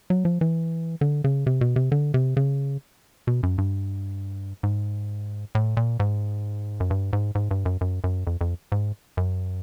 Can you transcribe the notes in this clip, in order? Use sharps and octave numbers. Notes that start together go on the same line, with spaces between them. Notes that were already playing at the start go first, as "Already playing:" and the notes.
F#3
F3
E3
D3
C#3
C3
B2
C3
D3
C3
C#3
B2
F#2
G2
G#2
A2
A#2
G#2
F#2
G2
G#2
G#2
G2
F#2
F#2
F#2
F2
F2
G#2
F#2